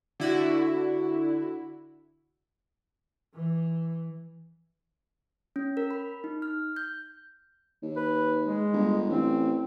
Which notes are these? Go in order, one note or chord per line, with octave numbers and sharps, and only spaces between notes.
D3 E4 F#4
E3
C#4
A#4
B5
D#4
F6
G6
D#2
B4
G#3
G1
A1 C4